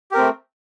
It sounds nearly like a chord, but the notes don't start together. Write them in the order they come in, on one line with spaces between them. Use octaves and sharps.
G4 A#4 C4 A3